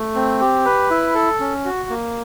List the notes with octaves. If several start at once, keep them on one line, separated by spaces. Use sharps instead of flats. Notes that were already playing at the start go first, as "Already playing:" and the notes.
Already playing: A3
C4
G4
B4
E4
A4
C#4
F#4
A#3